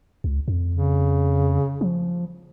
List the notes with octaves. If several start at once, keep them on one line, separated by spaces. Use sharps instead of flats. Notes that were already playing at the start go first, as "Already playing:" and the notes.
C#2
F2
C#3
F3